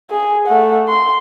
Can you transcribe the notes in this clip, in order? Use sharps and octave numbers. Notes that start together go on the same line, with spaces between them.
G#4
A3 F#5
C6